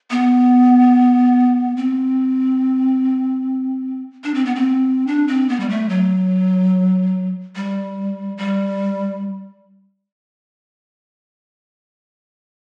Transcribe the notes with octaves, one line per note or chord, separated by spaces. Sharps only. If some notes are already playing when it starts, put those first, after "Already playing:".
B3
C4
D4
C4
B3
C4
D4
C4
B3
G3
A3
F#3
G3
G3